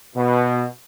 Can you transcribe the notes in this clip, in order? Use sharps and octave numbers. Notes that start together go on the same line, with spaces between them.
B2